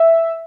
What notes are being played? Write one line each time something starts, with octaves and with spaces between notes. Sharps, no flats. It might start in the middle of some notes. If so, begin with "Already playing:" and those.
Already playing: E5